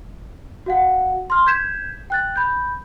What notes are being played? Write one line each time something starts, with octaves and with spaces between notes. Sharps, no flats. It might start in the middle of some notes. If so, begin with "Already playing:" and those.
F#4 F5 F#5
C6 F6
G6 G#6 B6 E7
G5 F#6 A6
B5 G6